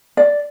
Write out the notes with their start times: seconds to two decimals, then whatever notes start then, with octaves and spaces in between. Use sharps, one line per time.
0.17 D5